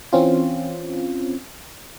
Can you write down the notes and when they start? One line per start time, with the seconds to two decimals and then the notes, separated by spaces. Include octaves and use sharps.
0.13 E3 C4 C#4 F4